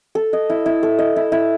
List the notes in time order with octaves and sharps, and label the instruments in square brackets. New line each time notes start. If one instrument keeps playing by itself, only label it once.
[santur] A4
D#5
E4
E4
A4
D#5
E4
E4